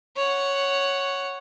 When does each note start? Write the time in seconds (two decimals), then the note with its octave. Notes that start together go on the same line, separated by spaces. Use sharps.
0.17 C#5 F#5